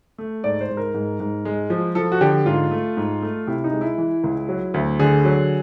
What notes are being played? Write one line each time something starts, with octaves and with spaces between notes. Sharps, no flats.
A3
G#2 D5
C5
G#2
A#4
G#2
G#2
G#3
F3
F3 A4
F#4
D3 G4
G#2 F4
A3
G#2
A3
C3 E4
D#4
G#3
E4
E3
C#2
F#3
D2
D3 G#4
F#3